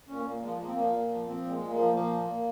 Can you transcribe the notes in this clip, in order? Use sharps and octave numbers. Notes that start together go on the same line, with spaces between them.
A#2 C#4
A#2 A#3
F3 G#3
F3 A#3
C4
A#2 A#3
A#2
F3
F3 C4
A#2 G#3
A#2
A#3
F3
F3 A#3
A#2
A#2